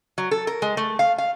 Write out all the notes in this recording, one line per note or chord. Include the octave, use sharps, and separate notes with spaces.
F#3
A4
A#4
G#3
A3
F5
F5